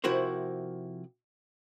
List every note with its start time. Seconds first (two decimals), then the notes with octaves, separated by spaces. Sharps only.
0.04 C3 F3 E4 F#4 A#4 C5